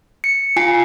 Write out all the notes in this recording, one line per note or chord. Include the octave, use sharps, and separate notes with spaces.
C#7
F4 G#5 C7